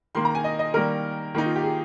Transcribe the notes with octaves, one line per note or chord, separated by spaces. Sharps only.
D#3 A#3 C6
A#5
G#5
D#5
D#5
D#3 G3 A#3 A#4
D#3 A#3 D#4
F4
G4
G#4